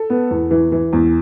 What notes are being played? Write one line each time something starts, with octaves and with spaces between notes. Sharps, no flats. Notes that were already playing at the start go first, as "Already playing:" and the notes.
Already playing: A4
B3
E2
E3
E3
E2